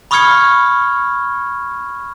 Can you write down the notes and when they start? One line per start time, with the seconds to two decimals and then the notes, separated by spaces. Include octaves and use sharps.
0.11 B5 C#6 D#6 F6 G#6 C#7